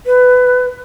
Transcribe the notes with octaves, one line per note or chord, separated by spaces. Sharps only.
B4